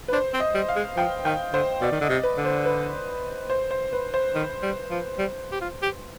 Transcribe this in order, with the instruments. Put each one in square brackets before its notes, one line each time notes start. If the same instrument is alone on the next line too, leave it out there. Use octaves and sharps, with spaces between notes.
[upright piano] B4
[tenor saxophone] D4 [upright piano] C5
[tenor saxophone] C4
[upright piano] D#5
[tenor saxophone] G3
[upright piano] F5
[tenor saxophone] G#3
[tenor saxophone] F3 [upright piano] G5
[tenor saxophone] D#3 [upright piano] G5
[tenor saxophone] D3 [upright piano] C5
[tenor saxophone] B2 [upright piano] D5
[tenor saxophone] D#3
[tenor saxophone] D3 [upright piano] D#5
[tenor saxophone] C3
[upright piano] B4
[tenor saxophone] D3
[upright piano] C5
B4
C5
C5
B4
C5
[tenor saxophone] D#3
G3
F3
G3
G4
F4
G4